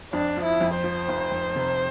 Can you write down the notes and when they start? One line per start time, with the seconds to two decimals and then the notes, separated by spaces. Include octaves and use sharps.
0.13 F2 D4
0.37 F3
0.45 E4
0.61 F2
0.76 C5
0.84 F3
1.08 F1
1.31 F1
1.56 C3